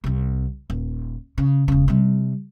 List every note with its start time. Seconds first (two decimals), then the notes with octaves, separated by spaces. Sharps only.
0.04 C2 C4
0.70 D#1
1.38 C#3
1.68 E1 C#3
1.88 C3 G3